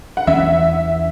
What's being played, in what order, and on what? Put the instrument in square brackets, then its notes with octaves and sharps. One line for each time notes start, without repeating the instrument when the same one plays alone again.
[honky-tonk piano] F#5
[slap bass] E2 E3 C#4 [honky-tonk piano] E5